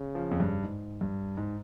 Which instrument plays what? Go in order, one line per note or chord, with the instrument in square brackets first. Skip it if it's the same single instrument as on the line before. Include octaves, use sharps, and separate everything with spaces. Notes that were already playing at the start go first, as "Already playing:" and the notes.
Already playing: [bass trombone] C#3
[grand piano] F3
F2
G2
G#2
G2
G#2